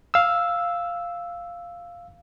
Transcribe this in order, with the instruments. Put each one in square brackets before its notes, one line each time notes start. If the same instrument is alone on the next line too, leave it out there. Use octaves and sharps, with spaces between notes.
[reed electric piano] F5 E6